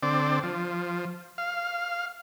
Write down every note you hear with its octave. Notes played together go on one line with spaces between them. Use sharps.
D3 C4 D5
F3
F5